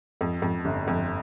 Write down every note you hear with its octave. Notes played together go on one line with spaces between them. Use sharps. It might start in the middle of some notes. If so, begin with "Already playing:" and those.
F2
F2
G1
F2